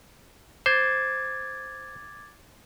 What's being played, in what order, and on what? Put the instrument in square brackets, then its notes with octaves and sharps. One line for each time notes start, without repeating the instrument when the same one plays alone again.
[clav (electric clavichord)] C5 [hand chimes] D6 G#6 A6